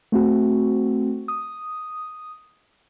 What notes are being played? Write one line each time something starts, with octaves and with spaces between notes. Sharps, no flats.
A3 C4 F#4
D#6